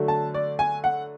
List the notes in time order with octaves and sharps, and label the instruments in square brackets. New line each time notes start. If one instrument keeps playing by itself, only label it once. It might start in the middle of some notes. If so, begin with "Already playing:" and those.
Already playing: [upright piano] D3 F#3 A3
A5
D5
G#5
F#5